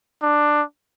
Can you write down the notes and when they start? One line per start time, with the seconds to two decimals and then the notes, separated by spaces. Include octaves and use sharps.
0.22 D4